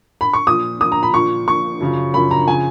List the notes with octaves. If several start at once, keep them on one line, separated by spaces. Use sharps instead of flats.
B5
C#6
A#2 F3 D#6
A#2 F3 D#6
A#5
B5
A#2 F3 C#6
A#2 F3 C#6
F#2 C#3 F3
F#2 C#3 F3 B5
A#5
C#3 F3 G#5